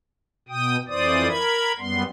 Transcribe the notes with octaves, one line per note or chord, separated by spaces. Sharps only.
B2 G5 D#6
F2 E3 C5 D5 D#6
A#4 B5 G#6
F#2 G3 B3 C6